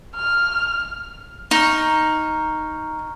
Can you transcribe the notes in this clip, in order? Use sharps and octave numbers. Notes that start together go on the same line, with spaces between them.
F6
D#4 A#5 C#6 F6